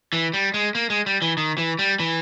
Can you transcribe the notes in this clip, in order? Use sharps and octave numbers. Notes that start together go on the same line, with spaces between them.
E3
G3
G#3
A#3
G#3
G3
E3
D#3
E3
G3
E3